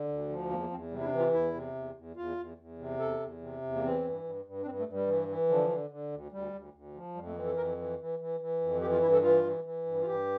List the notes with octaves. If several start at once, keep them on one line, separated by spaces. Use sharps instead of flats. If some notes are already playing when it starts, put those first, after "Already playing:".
Already playing: D3
D2
F3
E2 A#3
A#3
E2 C4
C3 G3
E4
D4
E3
F4
E2 E4
C3
E2
E2
E2 F4
E2
E2
C3
E2 A4
E2
C3
E2
A#3
E3 C4
G2
G2
G2
D4
G2 C4
A3
G2
G3
E3
E3
D3 F3
D3
D3
D2
D2 G3
D2
D2
F3
F2 G3
A3
A#3
E3 C4
A4
F2 A#4
E3
E3
E3
E3
F2
E3 G4
F4
G2 E4
A4
E3 F4
E3
E3
G2
F4
G2 G4